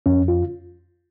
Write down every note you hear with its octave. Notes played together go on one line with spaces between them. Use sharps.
F2 C#4
F4